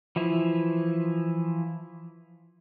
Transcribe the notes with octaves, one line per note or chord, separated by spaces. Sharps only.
E3 F3 E4